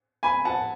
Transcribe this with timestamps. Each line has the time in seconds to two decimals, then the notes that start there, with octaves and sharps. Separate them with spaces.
0.23 G#5 B5
0.45 F#5 A5